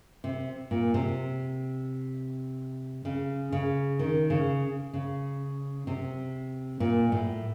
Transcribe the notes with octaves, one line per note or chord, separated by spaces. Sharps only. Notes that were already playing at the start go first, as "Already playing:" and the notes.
C3
A#2
C3
C#3
C#3
D#3
C#3
C#3
C3
A#2
A2